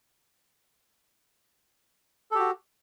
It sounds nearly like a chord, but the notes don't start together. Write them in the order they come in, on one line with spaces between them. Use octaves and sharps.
A4 G4 F#4